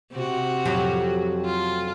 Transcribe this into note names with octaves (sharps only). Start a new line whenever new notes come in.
C3 F#4
F2 F#3 G4
F4